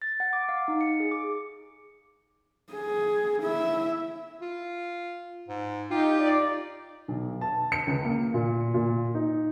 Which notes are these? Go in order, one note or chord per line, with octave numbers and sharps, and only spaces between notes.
A6
F#5
D6
F5
D#4
C#7
G#4
D6
G#4
E4 E5
F4
G#2
D#4 F4 G4
D#4 D5
B1
A5
C#7
C#2
A#3
A#2
A#2
D#4